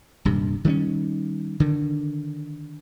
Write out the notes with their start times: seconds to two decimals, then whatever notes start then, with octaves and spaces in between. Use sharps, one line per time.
0.25 D#1 G2 C3
0.65 D#3 G3 A3 C#4
1.60 D3 D#3